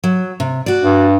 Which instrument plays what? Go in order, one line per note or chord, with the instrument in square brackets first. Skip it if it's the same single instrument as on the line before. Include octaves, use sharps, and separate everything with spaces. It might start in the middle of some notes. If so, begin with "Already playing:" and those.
[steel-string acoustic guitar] F#3
C3
F#4 D5
[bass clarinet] G2